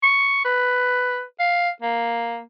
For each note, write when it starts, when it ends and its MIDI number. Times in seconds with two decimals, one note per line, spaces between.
0.03 0.43 85
0.45 1.22 71
1.40 1.69 77
1.82 2.41 58